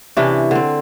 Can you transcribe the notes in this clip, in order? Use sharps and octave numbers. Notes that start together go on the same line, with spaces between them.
C3 E3 C#4 D4
D3 C4